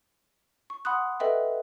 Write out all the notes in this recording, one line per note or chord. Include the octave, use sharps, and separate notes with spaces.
C#6
F#5 B5 C6 D#6 F#6
A4 B4 D#5 E5 G5